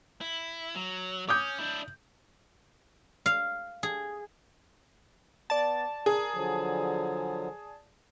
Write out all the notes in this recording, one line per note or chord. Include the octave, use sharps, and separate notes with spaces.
E4
F#3
C#4 D6 D#6 G6
D4 E4
F5
G#4
B3 D5 A5
G#4 A#4
D3 F3 F#3